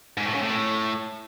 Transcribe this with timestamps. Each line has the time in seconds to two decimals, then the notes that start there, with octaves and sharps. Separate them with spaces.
0.18 G#2
0.26 A2
0.35 C#3
0.43 A2